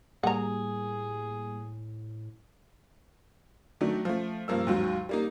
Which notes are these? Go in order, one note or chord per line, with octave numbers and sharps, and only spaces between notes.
A2 G3 A#3 G#4 F#5 A#5
D#3 F#3 A3 D4
F3 A3
G2 F3 A#3 E6
D#2 G#2 F#3
G3 A#3 D#4